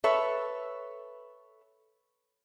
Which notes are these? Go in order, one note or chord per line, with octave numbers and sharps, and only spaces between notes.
A4 B4 C#5 E5